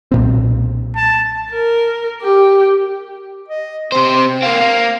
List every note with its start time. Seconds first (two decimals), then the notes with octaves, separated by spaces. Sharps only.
0.12 B1 A#2 C4
0.96 A5
1.51 A#4
2.22 G4
3.49 D#5
3.92 C3 C4 C5
4.16 C4
4.42 A#3 C4 F5
4.61 A#3